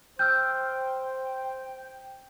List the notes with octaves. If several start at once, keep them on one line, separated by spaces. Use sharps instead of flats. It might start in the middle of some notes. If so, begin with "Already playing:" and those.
C5 G5 E6 F6 G6